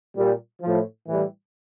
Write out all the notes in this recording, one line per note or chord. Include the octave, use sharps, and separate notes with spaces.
A#2 G3
A2 F3
A2 E3 G3